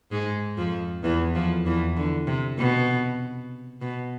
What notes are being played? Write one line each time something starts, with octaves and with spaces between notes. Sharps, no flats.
G#2 G#3
F2 F3
E2 E3
F2 F3
E2 E3
D3
C3
B2
B2